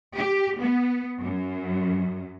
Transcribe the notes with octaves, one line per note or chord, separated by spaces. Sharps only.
G4
B3
F#2